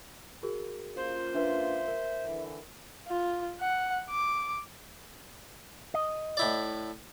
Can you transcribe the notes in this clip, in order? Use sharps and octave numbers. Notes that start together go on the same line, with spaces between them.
F#4 G#4 A#4
A#3 C#4 F4 C5
D4 B4 E5
A#4
D3 E3
F4
F#5
D6
D#5
A2 E4 D5